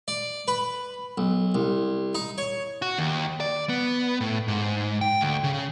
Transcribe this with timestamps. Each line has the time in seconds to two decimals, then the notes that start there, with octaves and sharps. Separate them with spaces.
0.08 D5
0.48 B4
1.18 B1
1.55 C2
2.15 D#4
2.38 C#5
2.82 F#4
2.98 D#2
3.40 D5
3.69 B3
4.21 A2
4.48 G#2
5.01 G5
5.21 D2
5.44 C#3